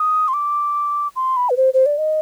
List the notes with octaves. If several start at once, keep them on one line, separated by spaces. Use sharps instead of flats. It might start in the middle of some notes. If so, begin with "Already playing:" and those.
Already playing: D#6
C6
D6
C6
B5
B4
C5
C5
D5
D#5